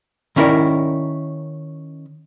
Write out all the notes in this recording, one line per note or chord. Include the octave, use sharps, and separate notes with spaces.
D#3 C#4 E4 A#4 D5